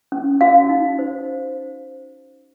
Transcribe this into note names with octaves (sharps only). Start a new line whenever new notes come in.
C#4
F#4 F5
D#4
C5